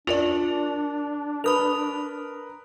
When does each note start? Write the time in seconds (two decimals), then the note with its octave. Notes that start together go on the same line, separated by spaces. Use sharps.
0.07 D4 F4 A#4 D5 F7
1.44 A#4 B4 B5 D#6 F7